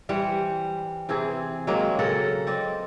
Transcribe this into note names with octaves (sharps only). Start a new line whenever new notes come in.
E3 G3 C5 F#5
C3 E3 C4 G#4
F#3 G#3 A#3 C4
C#3 A4 A#4 F#5
C4 D5 D#5